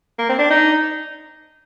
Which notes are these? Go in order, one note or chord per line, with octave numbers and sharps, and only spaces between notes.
A#3
C4
D4
D#4